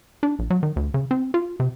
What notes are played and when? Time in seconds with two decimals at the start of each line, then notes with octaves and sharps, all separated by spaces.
0.23 D4
0.39 A#1
0.50 F#3
0.63 D#3
0.76 D2
0.94 C#3
1.11 C4
1.34 F4
1.60 C3